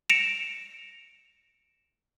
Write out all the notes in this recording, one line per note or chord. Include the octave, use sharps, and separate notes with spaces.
A#6 C#7 D7 E7 F7